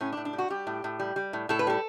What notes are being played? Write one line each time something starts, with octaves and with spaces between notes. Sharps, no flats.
A2 C#4
D4
A2
D4
G3
F#4
G3 G4
A2
A2
G3
G3
A2
A2 A4
B4
G3 A4